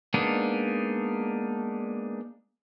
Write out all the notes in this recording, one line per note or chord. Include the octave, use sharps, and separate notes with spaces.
G#3 A#3 B3 D4 D#4